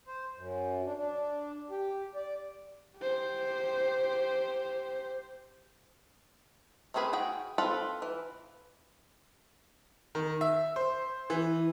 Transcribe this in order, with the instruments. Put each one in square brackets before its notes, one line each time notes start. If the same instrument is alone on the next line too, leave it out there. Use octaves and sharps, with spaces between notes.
[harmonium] C5
F#2
D4
D4
G4
D5
[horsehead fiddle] G4 C5
[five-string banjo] A3 C4 C#4 G#4 B4
F#4 G#4 G5
C4 F4 A4 B4
E3
[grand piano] D#3
E5
C5
E3